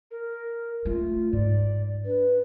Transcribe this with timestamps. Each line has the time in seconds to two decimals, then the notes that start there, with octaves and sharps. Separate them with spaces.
0.11 A#4
0.85 A3 F4
1.33 G#2 D5
2.05 D4 B4